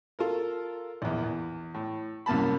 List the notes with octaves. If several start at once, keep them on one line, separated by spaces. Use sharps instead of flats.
F4 A4 A#4
A#1 E2
E2
A2
C2 F#2 A#3 A5 B5